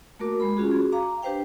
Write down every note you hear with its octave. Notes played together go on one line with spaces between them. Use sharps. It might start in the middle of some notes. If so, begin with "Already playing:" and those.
A3 A#3 F#4 A#4 D6
G#3 B5
C#4 F4 F#4 G#4
F#4 G#4
F5 A#5 D6
D4 G4 B4 C5 F5 G5